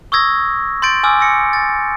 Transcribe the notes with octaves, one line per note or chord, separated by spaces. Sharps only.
C#6 D#6 E6 G#6 A#6
C6 G6 A6 D7
G#5 D6 E6 F6
E6 A#6 C#7
A6